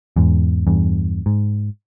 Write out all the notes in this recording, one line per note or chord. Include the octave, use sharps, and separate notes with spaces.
E2 G#2
E2 G2
G#2